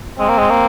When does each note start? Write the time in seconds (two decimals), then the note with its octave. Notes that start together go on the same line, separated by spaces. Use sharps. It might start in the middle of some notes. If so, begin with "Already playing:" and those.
0.20 G#3 C4
0.29 A#3
0.38 G#3
0.50 A#3